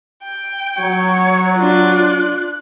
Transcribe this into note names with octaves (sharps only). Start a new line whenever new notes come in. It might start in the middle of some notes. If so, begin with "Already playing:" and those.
G5
F#3 C#5
D4 F4 F#6